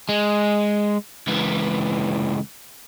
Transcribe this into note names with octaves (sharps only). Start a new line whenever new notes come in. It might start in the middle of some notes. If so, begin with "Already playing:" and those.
G#3
C#2 E3